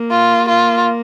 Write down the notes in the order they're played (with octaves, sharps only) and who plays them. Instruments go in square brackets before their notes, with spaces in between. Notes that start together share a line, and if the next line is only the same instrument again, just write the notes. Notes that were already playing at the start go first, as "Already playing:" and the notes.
Already playing: [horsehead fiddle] A#3
[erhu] F4
F4